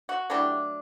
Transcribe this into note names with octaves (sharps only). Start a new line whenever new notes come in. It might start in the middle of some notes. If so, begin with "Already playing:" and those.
F#4
F#3 A3 D4 E4 G4